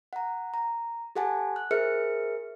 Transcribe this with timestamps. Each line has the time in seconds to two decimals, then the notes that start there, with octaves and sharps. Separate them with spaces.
0.13 F#5 A#5
0.54 A#5
1.16 G4 A4 F#5 G#5 A5
1.56 F#6
1.71 G#4 A#4 C5 E5 F6 C#7